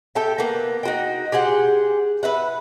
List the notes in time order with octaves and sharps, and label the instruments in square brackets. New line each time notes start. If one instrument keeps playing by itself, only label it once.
[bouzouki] G4 A4 E5 G5
A#3 B3
D#4 F#4 G5
G4 G#4 C5 F#5
B4 E5 F#5